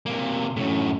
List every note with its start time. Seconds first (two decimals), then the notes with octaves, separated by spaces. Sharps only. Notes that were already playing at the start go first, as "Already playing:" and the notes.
0.06 C3 A#3
0.56 F#2 A2